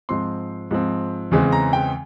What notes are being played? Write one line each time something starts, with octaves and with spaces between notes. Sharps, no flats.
G#2 F3 C4 C6
G#2 F3 C4
E2 C#3 E3 G#3 C4
A#5
G5